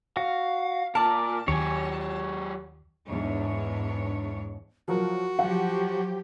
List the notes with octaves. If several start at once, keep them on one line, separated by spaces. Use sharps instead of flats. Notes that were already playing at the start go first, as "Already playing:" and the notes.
F#4 F5
A#2 A#4 D5 A5
D#2 F#3 G4 C#5 G#5
E2 G#2 D4 C#5
F3 F#3 F#4 A#4
F3 F#3 G4 F#5